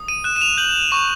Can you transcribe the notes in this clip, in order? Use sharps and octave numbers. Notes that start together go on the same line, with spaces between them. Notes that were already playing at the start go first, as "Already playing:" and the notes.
Already playing: D#6
D#7
F#6 E7
E7
F7
G6 F#7
C#6 F7